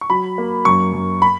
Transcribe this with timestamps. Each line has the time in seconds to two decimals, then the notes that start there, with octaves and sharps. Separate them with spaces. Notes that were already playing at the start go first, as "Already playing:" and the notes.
0.01 C#6
0.10 F#3 B5
0.38 A#3
0.65 F#2 C#6
0.93 F#2
1.22 B5